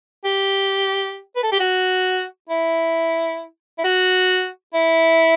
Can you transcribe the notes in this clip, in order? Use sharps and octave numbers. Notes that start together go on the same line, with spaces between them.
G4
B4
A4
G4
F#4
E4
E4
F#4
E4